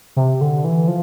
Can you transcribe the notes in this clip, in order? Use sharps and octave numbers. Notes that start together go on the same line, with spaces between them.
C3
D3
E3
F3